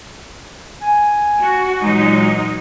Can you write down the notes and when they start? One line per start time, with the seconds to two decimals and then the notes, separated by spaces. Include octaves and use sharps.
0.82 G#5
1.39 F#4
1.82 A#2 E3 F#3 G#3 D#4